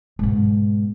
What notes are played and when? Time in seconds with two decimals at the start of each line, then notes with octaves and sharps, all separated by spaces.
0.19 G#2 B2